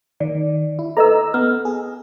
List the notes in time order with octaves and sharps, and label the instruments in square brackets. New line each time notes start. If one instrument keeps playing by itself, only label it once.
[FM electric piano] D#3 [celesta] D5
[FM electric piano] E4
[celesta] A4 B4 D#5 [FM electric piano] A#5 E6
[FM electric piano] B3 [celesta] F6
[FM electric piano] G#4